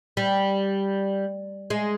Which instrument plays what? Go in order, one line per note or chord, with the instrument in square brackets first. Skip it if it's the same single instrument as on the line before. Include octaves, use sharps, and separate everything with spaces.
[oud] G3
G#3